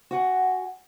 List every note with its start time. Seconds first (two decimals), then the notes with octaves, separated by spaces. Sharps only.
0.11 F#4 F#5 G#5